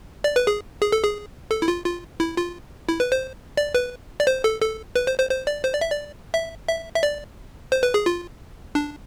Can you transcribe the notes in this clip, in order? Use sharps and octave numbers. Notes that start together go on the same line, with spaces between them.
D5
B4
G#4
G#4
A4
G#4
A4
E4
F4
F4
E4
F4
E4
B4
C5
D5
B4
D5
C5
A4
A4
B4
C5
C5
C5
D5
C5
D5
E5
D5
E5
E5
E5
D5
C5
B4
G#4
F4
D4